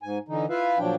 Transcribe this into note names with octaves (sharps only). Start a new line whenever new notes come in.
G#2 G#5
D3 E3 D#4
E4 F4 B4 E5 F5
A#2 F3 F#3 D4 G5